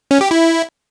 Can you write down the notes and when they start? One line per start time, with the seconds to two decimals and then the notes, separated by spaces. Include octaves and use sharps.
0.11 C#4
0.21 G4
0.31 E4